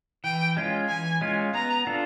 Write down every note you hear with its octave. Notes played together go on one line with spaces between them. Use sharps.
E3 G5
G#3 C#4 F4
E3 G#5
G#3 C#4 F4
B3 A#5
D4 F4 A4